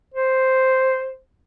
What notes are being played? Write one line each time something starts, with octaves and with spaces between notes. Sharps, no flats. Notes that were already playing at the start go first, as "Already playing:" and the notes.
C5